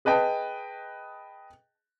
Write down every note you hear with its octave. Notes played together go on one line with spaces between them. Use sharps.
G#4 B4 D#5 G5 A5